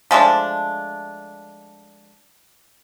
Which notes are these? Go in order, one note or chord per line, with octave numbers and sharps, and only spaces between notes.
F3 G#3 A3 D4